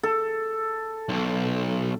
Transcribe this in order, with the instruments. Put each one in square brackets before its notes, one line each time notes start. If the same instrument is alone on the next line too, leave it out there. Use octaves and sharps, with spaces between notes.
[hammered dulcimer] A4
[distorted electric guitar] B1